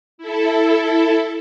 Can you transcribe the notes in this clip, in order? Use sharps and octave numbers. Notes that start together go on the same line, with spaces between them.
E4 A4